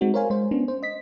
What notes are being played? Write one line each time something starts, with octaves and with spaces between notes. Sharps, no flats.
G#3 C4 D#4 F#4
A#4 C5 C#5 F5 G#5
G#3 C5
B3 C#4 D4
C5
D#5 B6